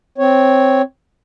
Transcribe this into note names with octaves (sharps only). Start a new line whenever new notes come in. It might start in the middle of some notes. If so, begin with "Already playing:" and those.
C4 C#5